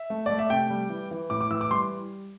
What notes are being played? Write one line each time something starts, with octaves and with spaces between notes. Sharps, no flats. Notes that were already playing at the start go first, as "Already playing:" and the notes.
Already playing: E5
A3
A3 D5
E5
C3 G5
G3
E3
E3
A2 D6
D6
E3 E6
D6
G3 C6